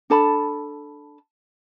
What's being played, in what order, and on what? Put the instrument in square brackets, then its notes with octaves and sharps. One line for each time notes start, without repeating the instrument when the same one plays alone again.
[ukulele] D4 A4 A5 B5